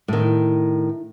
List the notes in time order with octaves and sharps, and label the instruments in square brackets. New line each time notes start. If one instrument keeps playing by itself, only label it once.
[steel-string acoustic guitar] A2 D#3